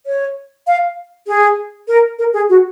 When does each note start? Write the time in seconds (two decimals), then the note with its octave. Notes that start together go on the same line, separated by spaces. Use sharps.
0.06 C#5
0.67 F5
1.28 G#4
1.88 A#4
2.19 A#4
2.33 G#4
2.49 F#4